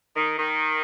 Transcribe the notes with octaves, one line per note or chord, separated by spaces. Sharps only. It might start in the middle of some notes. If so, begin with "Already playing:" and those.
D#3
D#3